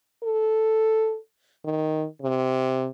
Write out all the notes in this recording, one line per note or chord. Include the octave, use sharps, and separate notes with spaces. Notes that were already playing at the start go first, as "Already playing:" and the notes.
A4
D#3
C3